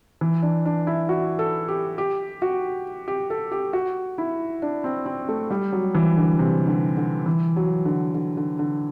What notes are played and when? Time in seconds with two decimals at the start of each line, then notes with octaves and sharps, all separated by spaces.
0.21 E3
0.42 D4
0.65 D4
0.87 E4
1.09 F#4
1.39 A4
1.68 G4
1.98 G4
2.42 F#4
3.08 G4
3.30 A4
3.52 G4
3.73 F#4
4.18 E4
4.62 D4
4.84 C4
5.06 C4
5.29 A3
5.51 G3
5.72 F#3
5.95 E3
6.17 D3
6.39 C3
6.67 D3
6.97 D3
7.26 E3
7.56 F#3
7.85 D3
8.14 D3
8.37 D3
8.59 D3